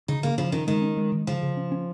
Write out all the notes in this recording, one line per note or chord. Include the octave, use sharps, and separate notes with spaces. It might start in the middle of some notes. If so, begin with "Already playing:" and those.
C#3 D#4
C#3 A#3
C#3 F3
D#3 C#4
D#3 G#3
C#4
G#3
D#3
C#3 F3
C#3
C#4
C#4